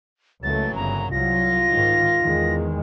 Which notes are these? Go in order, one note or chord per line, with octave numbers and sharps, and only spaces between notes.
C#2 E3 F#3 A3 A#3 A6
G1 C#3 A#5
C2 F#3 F4 A#6
G#2 D#3
E2 D#3 G#3